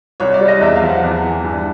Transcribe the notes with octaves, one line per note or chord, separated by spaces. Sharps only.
C2 C#5
D5
G3
D#5
E2 E5
F5
F3
F#5
E2
E3
G2